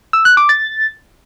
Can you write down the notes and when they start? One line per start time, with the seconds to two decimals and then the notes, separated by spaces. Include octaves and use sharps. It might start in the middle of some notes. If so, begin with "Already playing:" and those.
0.13 E6
0.25 F#6
0.37 D6
0.49 A6